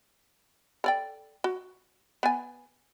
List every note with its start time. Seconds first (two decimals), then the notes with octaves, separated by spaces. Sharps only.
0.84 A4 D5 G5
1.44 F#4
2.23 B3 G#5